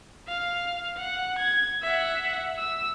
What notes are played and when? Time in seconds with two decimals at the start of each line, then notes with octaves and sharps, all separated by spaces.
0.28 F5
0.98 F#5
1.39 G#6
1.82 E5 F#5
2.58 E6